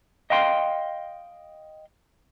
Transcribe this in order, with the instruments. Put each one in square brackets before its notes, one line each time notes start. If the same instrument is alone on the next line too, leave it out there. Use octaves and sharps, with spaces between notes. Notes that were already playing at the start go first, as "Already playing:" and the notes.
[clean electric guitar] D#5 F5 G5 C6